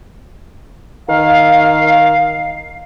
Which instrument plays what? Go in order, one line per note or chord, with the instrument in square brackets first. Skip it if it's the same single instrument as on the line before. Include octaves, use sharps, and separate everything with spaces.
[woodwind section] D#3 F5